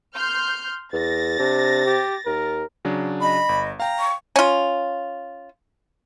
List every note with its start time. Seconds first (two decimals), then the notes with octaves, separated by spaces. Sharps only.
0.15 C6 F6 G6
0.93 E2 A6 A#6
1.39 C3 D4
1.86 G4
2.26 D#2 A#4
2.85 C#3 F#3 D4
3.22 D#5 B5
3.49 G1
3.80 F5 G5 A#5
4.00 C#6
4.36 C#4 F4